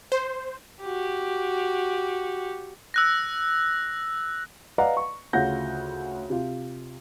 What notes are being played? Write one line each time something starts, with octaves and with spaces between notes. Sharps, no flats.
C5
F#4 G4
E6 F#6 A#6
B4 D5 D#5 F5 F#5 A#5
C#6
D2 C#3 F4 F#5 G6 A#6
C3 F4